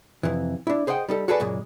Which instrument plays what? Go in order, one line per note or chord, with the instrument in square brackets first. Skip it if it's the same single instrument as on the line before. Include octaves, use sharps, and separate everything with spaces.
[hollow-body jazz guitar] F2 C3 E3
D4 E4
G#4 C5 D#5 F#5 G5
G3 D#4 A4
F#4 G#4 A4 B4 D5 G#5
F#2 A#2 C#3 G#3